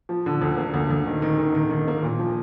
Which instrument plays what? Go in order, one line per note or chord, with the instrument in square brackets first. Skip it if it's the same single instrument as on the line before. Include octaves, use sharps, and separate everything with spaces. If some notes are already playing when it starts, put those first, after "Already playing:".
[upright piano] F3
D3
D2
A#3
D2
D2
D#3
D#3
D#3
D#3
D#3
A#3
A#2
F3